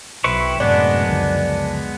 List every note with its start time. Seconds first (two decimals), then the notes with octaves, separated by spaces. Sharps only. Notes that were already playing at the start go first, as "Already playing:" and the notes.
0.24 B1 C4 E4 B4 C#6
0.60 F#2 A2 C3 G#3 A3 B3 D4
1.09 C#2 D3 F3